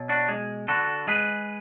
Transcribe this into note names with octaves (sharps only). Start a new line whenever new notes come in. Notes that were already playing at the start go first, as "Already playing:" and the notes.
Already playing: B2 F#3
D4 F#4
G#3
D3 F#4 A4
G#3 G#4 B4